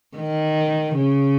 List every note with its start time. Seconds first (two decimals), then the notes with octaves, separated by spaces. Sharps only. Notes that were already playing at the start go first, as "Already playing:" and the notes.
0.17 D#3
0.96 C#3